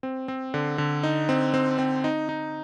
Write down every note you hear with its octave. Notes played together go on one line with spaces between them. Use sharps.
C4
C4
D3
D3
D#4
C4
C4
C4
D#4
D#4